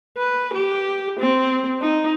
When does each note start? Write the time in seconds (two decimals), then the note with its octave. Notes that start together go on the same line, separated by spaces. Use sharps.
0.18 B4
0.54 G4
1.20 C4
1.82 D#4